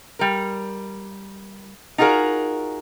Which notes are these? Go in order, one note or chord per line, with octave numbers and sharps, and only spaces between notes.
G3 A#4
D#4 F4 F#4 G#4 A#4